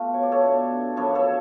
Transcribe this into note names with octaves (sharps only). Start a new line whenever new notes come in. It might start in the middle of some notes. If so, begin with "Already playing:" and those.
Already playing: B2 A3 F4
C#5
D5
A4 C#5
B2 A3 D4
F#2 F3 B3 D4 A4 C#5
A4 C#5